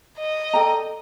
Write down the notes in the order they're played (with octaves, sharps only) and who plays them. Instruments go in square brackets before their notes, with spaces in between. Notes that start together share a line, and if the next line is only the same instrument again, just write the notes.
[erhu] D#5
[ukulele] A4 D5 G5 A#5